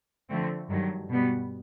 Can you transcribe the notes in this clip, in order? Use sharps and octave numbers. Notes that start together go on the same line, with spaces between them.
D3 F3 A3 C4
G2 D#3 F#3
B2 G3 B3